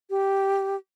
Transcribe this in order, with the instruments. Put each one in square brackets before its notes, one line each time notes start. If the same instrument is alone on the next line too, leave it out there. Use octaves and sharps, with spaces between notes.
[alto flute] G4